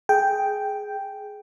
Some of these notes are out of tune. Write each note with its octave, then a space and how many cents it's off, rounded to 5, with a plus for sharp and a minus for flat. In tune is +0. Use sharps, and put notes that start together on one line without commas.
G#4 +10 G5 +0